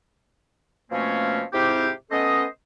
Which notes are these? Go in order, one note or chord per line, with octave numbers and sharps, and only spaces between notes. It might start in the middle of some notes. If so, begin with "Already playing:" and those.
B2 F3 A3 A#3 C4 C#4
G#2 C3 C4 E4 F4 G4
A3 B3 C#4 A4 C5 D#5